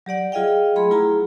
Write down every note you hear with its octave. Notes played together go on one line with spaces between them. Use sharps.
F#3 G4 D5 F#5
F#3 F4 G#4 D#5 F5 G5
A3 G#4 B5 C6
F#3 E4 F4 G#4 A#5